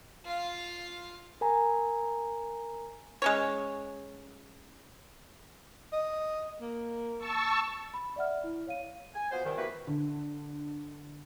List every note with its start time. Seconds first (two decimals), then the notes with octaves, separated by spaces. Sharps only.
0.25 F4 F5
1.41 A#4 G#5 A#5
3.22 G#3 C#4 C#5
5.93 D#5
6.61 A#3
7.19 A5 C#6 E6
7.94 B5
8.16 D5 E5 F#5 F6
8.44 E4
8.67 C#5 F5 D#7
9.15 G#5
9.32 B3 F4 F#4 C5
9.45 C2 D#3
9.58 A#3 B3 E4 F#4 G4 B4
9.87 D3